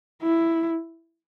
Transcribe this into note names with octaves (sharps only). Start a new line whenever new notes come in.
E4